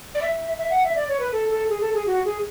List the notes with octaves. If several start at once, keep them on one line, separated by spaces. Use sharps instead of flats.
D5
E5
E5
F#5
E5
D5
C#5
B4
A4
A4
G#4
A4
G#4
F#4
G#4